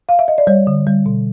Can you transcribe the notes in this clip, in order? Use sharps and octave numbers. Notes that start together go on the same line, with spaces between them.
F5
E5
D#5
D5
G3 C#5
D3
G3
B2